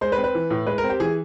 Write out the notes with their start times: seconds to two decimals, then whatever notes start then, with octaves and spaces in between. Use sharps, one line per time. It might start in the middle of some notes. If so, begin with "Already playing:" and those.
0.01 G#3 C5
0.12 B4
0.18 C4
0.24 B4
0.35 E3
0.50 A2
0.67 G#3 B4
0.78 A#4
0.84 C4
0.90 G4
1.00 E3 G#4